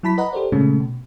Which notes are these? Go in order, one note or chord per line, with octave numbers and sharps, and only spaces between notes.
F#3 E4 A5 B5 B6
B4 D#5 F#5 A#5 B5
G4 A4 A#4 C5 D5
A#2 C#3 G#3 A3 C#4
B2